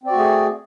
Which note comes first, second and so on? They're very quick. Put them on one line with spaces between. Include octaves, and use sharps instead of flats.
C4 D5 F#4 A3 G#4